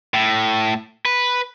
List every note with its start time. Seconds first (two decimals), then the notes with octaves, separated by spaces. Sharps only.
0.14 A2
1.05 B4